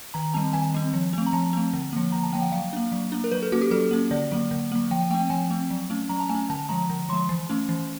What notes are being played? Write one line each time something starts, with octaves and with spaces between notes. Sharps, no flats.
D#3 A#5
G3 C4 A5
D#3 G#5
G3 C4
F3
A3 C4
A#5
F3 A5
A3 C4
D3
F3 A#3
D3 A#5
A5
F3 A#3 G5
F#5
F#3 F5
A#3 D4
F#3
A#3 D4
A#4
F#3 B4
A4
A#3 C#4 F#4
G4
F#3 A4
A#3 C#4
D3 D5
F#3 A#3
D3
F#3 A#3
F3 G5
A3 C4 G5
F3 G#5
A3 C4
F#3
A3 C#4
F#3 A#5
A5
A3 G#5
C#4
D3 A5
F3 G#3 A#5
D3
F3 G#3 C6
E3
A3 C#4
E3